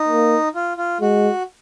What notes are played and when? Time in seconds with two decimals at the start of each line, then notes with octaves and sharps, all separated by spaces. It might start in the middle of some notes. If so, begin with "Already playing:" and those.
Already playing: D#4
0.08 A#3
0.55 F4
0.77 F4
1.01 G#3 F#4